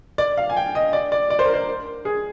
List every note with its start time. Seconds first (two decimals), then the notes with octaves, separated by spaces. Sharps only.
0.18 D5
0.37 F5
0.50 G#5
0.57 G5
0.75 D#5
0.93 D5
1.12 D5
1.30 D5
1.39 C5
1.46 A#4
1.54 C5
2.05 G#4